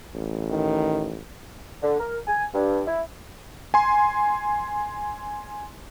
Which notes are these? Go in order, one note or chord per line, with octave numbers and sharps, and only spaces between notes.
A1
D#3
D3
A#4
G#5
G2
E4
G#5 C6